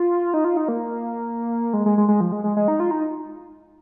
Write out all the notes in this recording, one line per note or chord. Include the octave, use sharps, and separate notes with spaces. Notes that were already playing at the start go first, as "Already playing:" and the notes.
Already playing: F4
D#4
F4
D#4
A#3
G#3
G#3
G#3
G#3
F3
G#3
G#3
G#3
D#4
F4
D#4